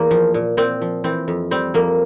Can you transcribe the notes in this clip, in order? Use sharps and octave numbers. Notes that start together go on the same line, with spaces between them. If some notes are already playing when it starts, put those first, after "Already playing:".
Already playing: E2 A#3
F3
A#2
A#2 C4
F3
E3 C4
F2
G3 C4
F2 A#3